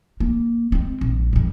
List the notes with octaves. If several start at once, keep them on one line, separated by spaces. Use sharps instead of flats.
A#3
G#3 C4
A#1
F2 G3